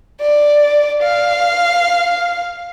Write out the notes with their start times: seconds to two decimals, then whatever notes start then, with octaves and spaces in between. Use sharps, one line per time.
0.21 D5
1.03 F5